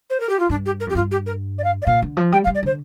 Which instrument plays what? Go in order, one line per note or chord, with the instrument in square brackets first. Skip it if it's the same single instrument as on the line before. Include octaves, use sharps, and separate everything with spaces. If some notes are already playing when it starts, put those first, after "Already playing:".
[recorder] C5
A#4
G4
F4
[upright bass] G2 [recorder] D4
[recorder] G4
A#4
[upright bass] F2 [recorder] G4
[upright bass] G2 [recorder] F4
[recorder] G4
A#4
D5
F5
D5
[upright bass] A#2 [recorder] F5
[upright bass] D3
F3
[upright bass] G3 [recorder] G5
[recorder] F5
[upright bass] G3
[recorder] D5
[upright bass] D3 [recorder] C5